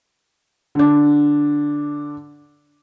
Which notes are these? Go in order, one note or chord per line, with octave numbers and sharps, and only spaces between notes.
D3 D4